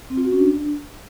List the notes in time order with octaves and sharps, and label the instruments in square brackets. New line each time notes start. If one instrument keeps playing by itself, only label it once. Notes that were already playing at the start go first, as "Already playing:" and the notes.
[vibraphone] C4
F4
F#4
C#4
D4